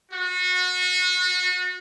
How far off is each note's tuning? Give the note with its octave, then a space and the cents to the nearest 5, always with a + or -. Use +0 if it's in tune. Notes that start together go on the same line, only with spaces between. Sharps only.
F#4 -30